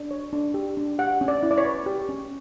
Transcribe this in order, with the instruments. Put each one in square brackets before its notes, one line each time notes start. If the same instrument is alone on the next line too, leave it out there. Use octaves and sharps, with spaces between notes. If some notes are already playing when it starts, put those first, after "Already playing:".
Already playing: [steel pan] D4
C#5
D4
G4
D4
G4 F#5
C#4
D5
E4
D5
C#5
B4
G4
C#4